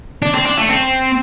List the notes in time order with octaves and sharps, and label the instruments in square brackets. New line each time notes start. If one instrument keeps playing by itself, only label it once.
[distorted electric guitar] D4
C4
D4
A3
C4